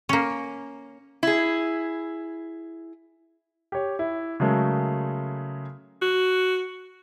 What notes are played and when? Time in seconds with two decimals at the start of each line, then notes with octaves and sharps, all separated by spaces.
0.09 A#3 C#4
1.23 E4 G#4
3.72 G4 C#5
3.99 E4
4.40 C#3 F#3 G#3 A3 A#4
6.02 F#4